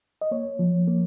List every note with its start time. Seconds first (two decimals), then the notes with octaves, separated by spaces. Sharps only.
0.21 D#5
0.31 A#3 C#5
0.59 F3
0.87 A#3